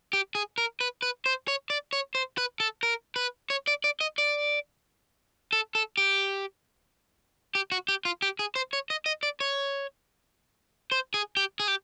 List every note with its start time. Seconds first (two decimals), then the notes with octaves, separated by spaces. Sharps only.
0.13 G4
0.35 G#4
0.58 A#4
0.80 B4
1.02 B4
1.26 C5
1.48 C#5
1.70 D5
1.93 C#5
2.15 C5
2.38 B4
2.60 A4
2.83 A#4
3.16 B4
3.50 C#5
3.67 D5
3.84 D5
4.01 D#5
4.18 D5
5.53 A4
5.75 A4
5.97 G4
7.55 G4
7.72 F#4
7.88 G4
8.05 F4
8.22 G4
8.39 G#4
8.56 C5
8.73 C#5
8.90 D#5
9.06 D#5
9.23 D5
9.40 C#5
10.92 C5
11.14 G#4
11.37 G4
11.60 G#4
11.68 G4